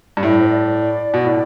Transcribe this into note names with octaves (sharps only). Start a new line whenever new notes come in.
G2
A2 E5
D5
C5
D5
B2
A2